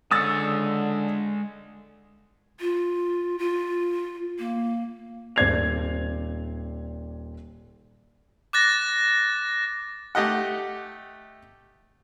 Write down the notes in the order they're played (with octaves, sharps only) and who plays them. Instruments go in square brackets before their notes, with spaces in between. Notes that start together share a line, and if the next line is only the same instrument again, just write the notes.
[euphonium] D3 [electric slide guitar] G#3 C#5 [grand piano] D#6 E6 A6
[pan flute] F4
F4
A#3
[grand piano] D#1 C4 D5 G#6 C7 F7
[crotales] D6 F#6 A6 A#6
[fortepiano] A3 G4 D#5 F#5